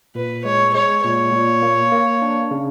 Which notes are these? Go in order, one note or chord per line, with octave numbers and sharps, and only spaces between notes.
A#2 B4
G#3 C#5
G#3 C#5
A#2 C#5
A#2
A#3
A#3
D4
C#3